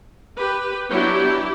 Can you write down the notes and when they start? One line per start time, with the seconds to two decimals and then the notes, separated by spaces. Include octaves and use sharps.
0.37 G4 B4
0.90 F#3 B3 D4 E4 G4